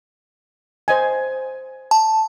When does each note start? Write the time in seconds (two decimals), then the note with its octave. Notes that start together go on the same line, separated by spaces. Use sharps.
0.88 C5 D#5 G#5
1.91 A5